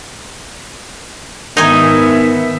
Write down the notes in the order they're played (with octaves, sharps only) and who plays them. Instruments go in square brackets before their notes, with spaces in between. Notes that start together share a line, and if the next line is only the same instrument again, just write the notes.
[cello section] G#2 B3 E5 [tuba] D#3 [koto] D#4 G#5